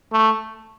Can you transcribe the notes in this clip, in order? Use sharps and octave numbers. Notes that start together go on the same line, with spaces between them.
A3